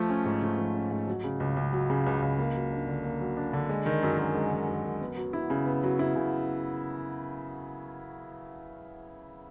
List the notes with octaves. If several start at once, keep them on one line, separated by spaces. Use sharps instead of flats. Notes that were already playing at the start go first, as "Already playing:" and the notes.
Already playing: F3 A3
C#4
G#2
A3
F3
C#4
G#2
F#3
C#3
C#2
C#2
F#3
C#3
C#2
C#2
A#3
F#3
D4
D3
A#3
F#3
D4
D3
G#3
D#3
F#2
F#2
G#3
D#3
F#2
F#2
B3
F#3
E4
C#3
B3
F#3
E4
C#3